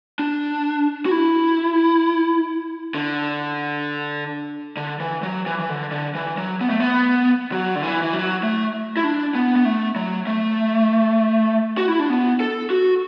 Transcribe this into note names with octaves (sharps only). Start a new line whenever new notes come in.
D4
F#4
E4
D3
D3
E3
F#3
E3
E3
D3
D3
E3
F#3
B3
A3
B3
F#3
D3
E3
E3
F#3
A3
E4
D4
B3
B3
A3
F#3
A3
F#4
E4
D4
B3
A4
F#4